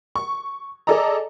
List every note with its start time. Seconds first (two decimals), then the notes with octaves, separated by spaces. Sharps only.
0.16 C#6
0.87 G#4 A4 D5 D#5 A#5